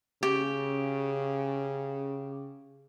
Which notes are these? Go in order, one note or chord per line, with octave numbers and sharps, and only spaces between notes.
C#3 C#4 G4